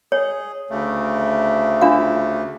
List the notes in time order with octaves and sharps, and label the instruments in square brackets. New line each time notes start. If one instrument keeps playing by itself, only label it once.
[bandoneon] G#4 [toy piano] C#5
[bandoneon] D2 C#3 A3
[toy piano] D4 F4 F5